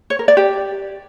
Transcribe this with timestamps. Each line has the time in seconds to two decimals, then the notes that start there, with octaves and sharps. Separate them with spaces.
0.10 C#5
0.19 A#4
0.28 D5
0.37 G4